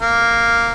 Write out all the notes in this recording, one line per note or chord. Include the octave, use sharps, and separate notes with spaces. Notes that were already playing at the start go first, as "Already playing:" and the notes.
A#3